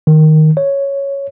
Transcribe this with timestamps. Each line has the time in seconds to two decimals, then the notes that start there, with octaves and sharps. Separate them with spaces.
0.07 D#3
0.57 C#5